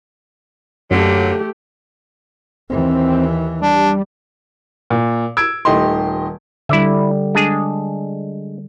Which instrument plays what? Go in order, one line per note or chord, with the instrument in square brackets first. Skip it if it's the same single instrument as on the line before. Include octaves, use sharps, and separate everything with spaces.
[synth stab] F#2 [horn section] D3 F#3 A#3 [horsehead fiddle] A3 G4
[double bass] D#2 E3 [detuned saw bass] C4
[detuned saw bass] G3 [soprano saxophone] D4
[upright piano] A#2
E6 G#6 D7
D#1 D#3 A3 G4 D#5 C6
[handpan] D3 G3 [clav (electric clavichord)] E4 D5 E5
[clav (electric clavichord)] G#3 D4 G#4